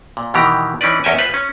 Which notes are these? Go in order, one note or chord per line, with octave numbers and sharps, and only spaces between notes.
A#2
B2 D#3 E3 G3 G4 A#5
E3 C#4 D#4 B4 D5
E2 C#4 A#4 E5 G5 G#5
F4 B4 C5 F5
C#4